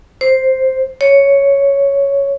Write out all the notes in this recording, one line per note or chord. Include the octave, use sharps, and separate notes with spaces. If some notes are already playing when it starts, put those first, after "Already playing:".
C5
C#5